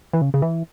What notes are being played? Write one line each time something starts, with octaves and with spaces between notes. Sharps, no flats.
E3
C#3
C#3
E3